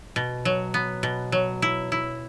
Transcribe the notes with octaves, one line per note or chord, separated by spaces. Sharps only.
B2
F#3
B3
B2
F#3
E4
E4